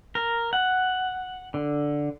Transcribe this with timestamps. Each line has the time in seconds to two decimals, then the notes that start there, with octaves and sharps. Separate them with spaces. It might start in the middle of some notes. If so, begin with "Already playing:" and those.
0.15 A#4
0.53 F#5
1.54 D3